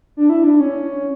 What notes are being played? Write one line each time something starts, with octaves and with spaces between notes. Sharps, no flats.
D4
E4
D4
C#4